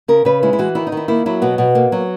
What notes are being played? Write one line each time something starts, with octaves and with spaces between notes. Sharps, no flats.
C#3 A#4
C#3 B4
G#3 E4
E4
E3 F#4
D#3 E4
D#4
D#3 E4
A#3 E4
F#3 E4
B2 B3
B2
A#3
F#3